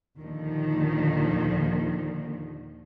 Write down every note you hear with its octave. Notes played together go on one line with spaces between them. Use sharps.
D#2 A#2 D3 D#3 F3